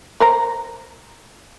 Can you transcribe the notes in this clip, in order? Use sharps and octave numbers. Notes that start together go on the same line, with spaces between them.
A#4 C5 A#5